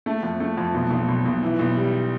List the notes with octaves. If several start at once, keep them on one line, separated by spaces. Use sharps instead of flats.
A3
F2
A3
F2
B1
B1
B1
B1
E3
B1
G3